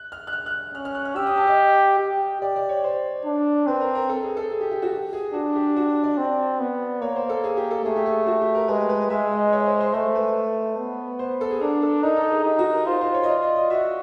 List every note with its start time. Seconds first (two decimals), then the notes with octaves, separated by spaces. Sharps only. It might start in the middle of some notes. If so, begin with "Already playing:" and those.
Already playing: F#6
0.12 F6
0.27 F#6
0.33 F6
0.46 F#6
0.75 C#4 F6
0.85 F6
0.95 F#6
1.05 F6
1.16 G4 E6
1.27 D#6
1.37 A5
1.47 D#5
1.99 G4
2.41 G4 D5
2.56 D5
2.69 C#5
2.84 C5
3.25 D4
3.67 C4 B4
3.81 A#4
3.95 A#4
4.09 A4
4.23 G#4
4.37 A4
4.51 G#4
4.61 G4
4.71 G4
4.82 F#4
4.92 G4
5.13 G#4
5.34 D4 F#4
5.56 G4
5.76 F#4
6.04 D5
6.18 C4
6.59 B3
7.01 A#3 C#5
7.16 C5
7.29 A4
7.44 G#4
7.57 G4
7.71 A4
7.85 A3 G#4
7.96 G4
8.06 G#4
8.27 F#4
8.41 G4
8.55 A#4
8.68 G#3 B4
8.89 B4
9.10 G#3 E5
9.32 D#5
9.53 C#5
9.66 C5
9.80 C5
9.94 A3 C5
10.15 B4
10.78 B3
11.19 C5
11.41 A4
11.51 G#4
11.61 D4 A#4
11.82 A4
12.03 D#4 A#4
12.17 A4
12.31 G#4
12.45 D#4 G4
12.59 F#4
12.73 A#4
12.86 F4 C5
13.01 C5
13.14 C#5
13.23 D#5
13.29 D5
13.42 D#5
13.56 D#5
13.70 F#4 E5